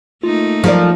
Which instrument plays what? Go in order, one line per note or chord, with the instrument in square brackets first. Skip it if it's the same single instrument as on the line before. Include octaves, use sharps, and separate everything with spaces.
[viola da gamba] A3 A#3 D#4 [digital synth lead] F4
[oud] F3 [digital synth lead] F#3 [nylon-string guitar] A4 A#4 D5